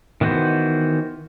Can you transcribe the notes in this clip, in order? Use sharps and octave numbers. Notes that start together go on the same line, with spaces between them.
D#3 E3 B3 F#4 C5